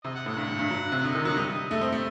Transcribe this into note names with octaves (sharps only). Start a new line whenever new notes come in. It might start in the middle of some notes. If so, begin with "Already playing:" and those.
C3 D#5
F#5
A2 F#5
G2 F#5
G2
G2
F#3
C3
D3 D#5
D#3 D#5
F#3 F#5
G3 D#5
A3 D#5
C4
A3